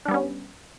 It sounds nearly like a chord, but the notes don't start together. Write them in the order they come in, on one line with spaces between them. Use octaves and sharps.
D4 G3 B3 C#4